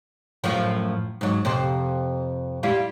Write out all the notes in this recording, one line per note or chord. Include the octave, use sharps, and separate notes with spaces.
F#2 A2 F3
G#2 F#3
F2 C3 C5
G3 E4 F4